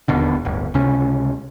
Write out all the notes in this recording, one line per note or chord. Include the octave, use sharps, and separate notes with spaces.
E1 D#2 B2 D3
D1 G1
C#2 C3 C#4